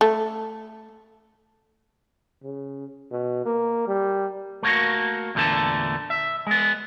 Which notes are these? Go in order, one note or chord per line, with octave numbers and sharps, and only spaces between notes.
A3
C#3
B2
A#3
G3
A3 A#3 F#4
E2 A#2 D3 A3 A5
E5
G#3 B3